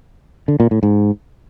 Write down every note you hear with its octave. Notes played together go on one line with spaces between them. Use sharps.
D3
A#2
A2
G#2